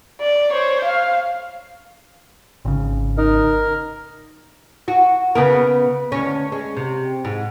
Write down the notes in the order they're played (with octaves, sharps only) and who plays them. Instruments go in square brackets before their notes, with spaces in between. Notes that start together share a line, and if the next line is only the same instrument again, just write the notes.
[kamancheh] D5
C5 C#5
F5
[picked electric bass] G#1 C#3
[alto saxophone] D#4 [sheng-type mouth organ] A#4
[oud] F#4
C#3 B3 A#4
D2 C#4
G#3 C#4
C3
G#2